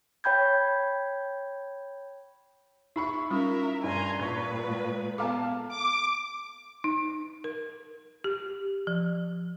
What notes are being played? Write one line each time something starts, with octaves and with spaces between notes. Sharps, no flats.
C#5 G5 B5 G6 G#6
D#4 E4 B5 C#6
G3 C#4 F4 A#4 E5
G2 G#5 A#5 C6
A#2 B4 C#6 G#6
G#3
B3 A4 F5 A5 A#5 D6
D6
D#4
A#4
G4
F3